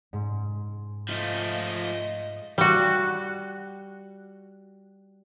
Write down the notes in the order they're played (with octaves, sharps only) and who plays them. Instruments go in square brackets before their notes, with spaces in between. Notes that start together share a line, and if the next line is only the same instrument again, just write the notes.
[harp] G#2
[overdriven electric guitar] F3 A3 [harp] F4 [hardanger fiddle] D#5
[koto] G3 F#4